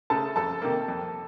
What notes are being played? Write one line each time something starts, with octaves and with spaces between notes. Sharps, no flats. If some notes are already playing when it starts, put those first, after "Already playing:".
C#3 A3 A4 A5
F2 A4 A5
C3 D#3 A#3
F2